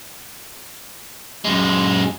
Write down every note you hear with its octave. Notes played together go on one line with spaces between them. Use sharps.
F#2 G#3